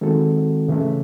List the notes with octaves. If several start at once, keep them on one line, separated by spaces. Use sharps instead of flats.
D#3 G#3 C4 F#4 A4
C#3 E3 A3